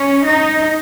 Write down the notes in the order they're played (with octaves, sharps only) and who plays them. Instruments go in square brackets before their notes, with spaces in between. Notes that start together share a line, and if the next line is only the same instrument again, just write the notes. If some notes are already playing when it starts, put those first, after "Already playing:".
Already playing: [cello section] C#4
D#4